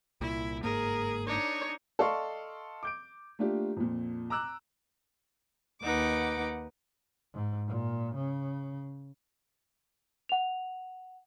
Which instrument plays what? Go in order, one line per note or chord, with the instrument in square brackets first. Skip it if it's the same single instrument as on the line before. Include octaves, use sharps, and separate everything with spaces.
[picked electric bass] C2 A#2 [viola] E4
[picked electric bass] G1 G#2 A#3 [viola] G#4 [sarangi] A#4
[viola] D4 D#4 [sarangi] C#5
[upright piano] A4 D5 D#5 F5 C6 C#6
D6 G6 D7
A3 A#3 D4 F4 G4
F2 A#2
A#5 D6 E6 F#6
[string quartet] D#2 F#5 D6 [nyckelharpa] D#4 B4
[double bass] G#2
A#2
C#3
[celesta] F#5 F7